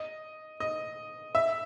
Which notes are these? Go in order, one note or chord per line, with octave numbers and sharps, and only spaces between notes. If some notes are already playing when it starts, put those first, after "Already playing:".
Already playing: D#5
D#5
E5